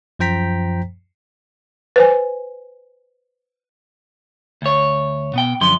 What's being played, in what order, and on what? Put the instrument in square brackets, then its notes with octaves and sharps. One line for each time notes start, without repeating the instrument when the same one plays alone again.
[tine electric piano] F#2 F3 C5 G5 A#5 B6
[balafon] B4 C5 G#5
[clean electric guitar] D2 C#5
B2 B3 G5
F#2 D3 F3 C6